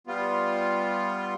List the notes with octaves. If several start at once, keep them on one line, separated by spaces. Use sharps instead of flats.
G3 B3 F4